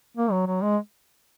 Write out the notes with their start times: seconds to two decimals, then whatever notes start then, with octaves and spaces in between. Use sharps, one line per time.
0.17 A#3
0.31 F#3
0.47 F#3
0.62 G#3